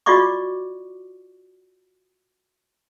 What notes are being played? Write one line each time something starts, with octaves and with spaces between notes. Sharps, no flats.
F4 F#4 D5 D#5 C#6 D6